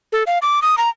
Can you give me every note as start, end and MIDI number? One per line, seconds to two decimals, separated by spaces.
0.12 0.23 69
0.27 0.39 77
0.42 0.62 86
0.62 0.75 87
0.78 0.89 82